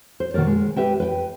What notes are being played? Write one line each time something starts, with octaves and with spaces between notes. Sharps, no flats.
C5
B2 D#3 A#3 A#4 D5
G#3
G4 B4 E5 G5
B4 G5